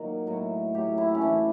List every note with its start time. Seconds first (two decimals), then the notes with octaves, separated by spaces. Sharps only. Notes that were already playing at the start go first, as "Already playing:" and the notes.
Already playing: A#2 D#3 F#3
0.27 A2 F#3
0.74 A2 F#3 G4
0.98 E4
1.15 C#4
1.21 A2 E3 D4